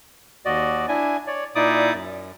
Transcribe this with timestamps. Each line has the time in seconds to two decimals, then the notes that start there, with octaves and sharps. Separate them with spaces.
0.45 D#2 F#4 D5 D#5
0.88 D4 E4 G#5
1.27 C#5 D5
1.55 A#2 D#4 E4 D5 D6 D#6
1.94 F#2